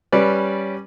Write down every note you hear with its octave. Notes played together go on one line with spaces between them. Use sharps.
G3 C#4 B4 D5